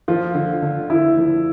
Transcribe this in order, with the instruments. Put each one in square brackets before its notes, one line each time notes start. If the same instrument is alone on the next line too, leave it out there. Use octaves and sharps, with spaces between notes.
[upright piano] F3 [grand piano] F4
[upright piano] D3
D3
[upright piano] D3 [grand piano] E4
[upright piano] F3